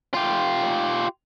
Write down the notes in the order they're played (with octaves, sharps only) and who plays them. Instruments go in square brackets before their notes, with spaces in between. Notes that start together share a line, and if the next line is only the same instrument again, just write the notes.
[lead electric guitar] F4 G4